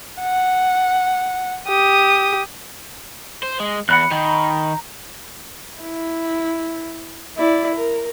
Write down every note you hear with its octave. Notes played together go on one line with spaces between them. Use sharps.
F#5
G4 D#6
C5
G#3
E2 F#5 B5 F#6
D#3 A#5 B5 G6
E4
E4 D5
A#4